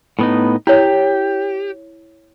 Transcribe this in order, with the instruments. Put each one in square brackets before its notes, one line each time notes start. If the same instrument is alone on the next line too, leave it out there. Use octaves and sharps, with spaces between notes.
[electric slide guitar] A2 B3 D#4
[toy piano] E4 C#5 [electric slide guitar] G4